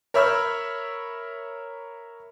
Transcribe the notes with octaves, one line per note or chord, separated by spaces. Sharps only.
A#4 C#5 E5 B5 E6 F6